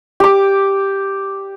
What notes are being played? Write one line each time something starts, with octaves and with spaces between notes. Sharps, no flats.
G4 D6